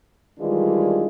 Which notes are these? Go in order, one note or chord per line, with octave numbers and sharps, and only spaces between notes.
D#3 E3 G3 G#3 D4 F4